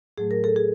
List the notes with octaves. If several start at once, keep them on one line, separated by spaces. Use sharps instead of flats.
A2 F#3 A3 G#4
A#4
A4
G#4